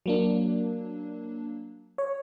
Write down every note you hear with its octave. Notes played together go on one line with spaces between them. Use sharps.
F#3 A#3 D4
C#5